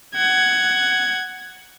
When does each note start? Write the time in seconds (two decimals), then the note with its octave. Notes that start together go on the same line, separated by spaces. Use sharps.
0.15 F#5 G#6